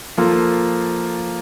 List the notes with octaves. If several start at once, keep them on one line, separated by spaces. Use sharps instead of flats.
F3 A#3 F4 A4